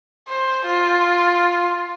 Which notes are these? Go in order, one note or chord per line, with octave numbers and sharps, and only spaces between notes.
C5
F4